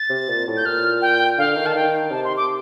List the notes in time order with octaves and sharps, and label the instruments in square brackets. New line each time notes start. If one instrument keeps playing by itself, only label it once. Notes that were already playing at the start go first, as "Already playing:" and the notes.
Already playing: [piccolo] A6
[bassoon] C3
A#2
A2
[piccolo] G6
[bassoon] A#2 [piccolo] F6
[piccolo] G5
[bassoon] D3 [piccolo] F5
[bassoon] D#3
[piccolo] A5
[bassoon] D#3 [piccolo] G5
[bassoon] C3 [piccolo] A5
[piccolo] C6
D6